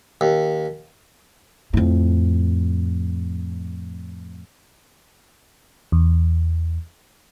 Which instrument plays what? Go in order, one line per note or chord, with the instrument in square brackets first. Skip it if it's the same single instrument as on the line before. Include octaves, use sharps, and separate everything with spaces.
[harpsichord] D#2
[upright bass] F2 A2
[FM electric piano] E2